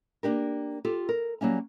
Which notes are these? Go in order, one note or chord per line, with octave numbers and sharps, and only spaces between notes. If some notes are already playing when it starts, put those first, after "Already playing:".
A#3 D4 G4 A#4
F4 G4 A4
A#4
F#3 G3 A#3 C#4